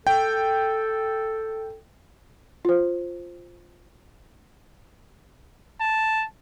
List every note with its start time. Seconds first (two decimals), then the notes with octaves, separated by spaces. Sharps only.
0.07 A4 G5
2.65 F4 C5
5.81 A5